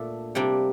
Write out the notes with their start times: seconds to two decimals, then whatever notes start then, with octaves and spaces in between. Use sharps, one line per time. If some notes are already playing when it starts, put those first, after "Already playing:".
Already playing: A#2 A3 D4 A4
0.35 C3 G3 A#3 D4